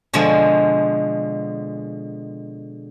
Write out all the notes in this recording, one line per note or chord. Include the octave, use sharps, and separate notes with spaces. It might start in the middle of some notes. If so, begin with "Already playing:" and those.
B2 D3 F3 G#3